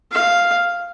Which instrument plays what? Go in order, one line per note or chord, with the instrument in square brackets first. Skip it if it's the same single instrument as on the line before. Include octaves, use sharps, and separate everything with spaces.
[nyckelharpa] F5